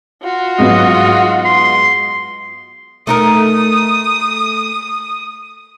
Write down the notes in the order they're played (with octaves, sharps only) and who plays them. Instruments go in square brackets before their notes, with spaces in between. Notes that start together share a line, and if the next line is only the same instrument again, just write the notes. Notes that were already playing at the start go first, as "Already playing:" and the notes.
[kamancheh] F4 F#4
[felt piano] G#2 F#3 B3 [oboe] D#5
[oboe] C6
[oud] A3 D#4 A#4 [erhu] D#6